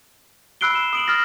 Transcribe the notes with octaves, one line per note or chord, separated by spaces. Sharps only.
B5 E6 F#6 C7 D7 G7
E7
D#6 D7 F#7
D#6 F6 A6 A#6